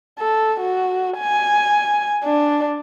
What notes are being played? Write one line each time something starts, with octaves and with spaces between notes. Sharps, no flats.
A4
F#4
G#5
D4